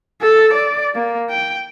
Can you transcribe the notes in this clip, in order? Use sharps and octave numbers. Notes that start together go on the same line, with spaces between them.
A4
D5
A#3
G5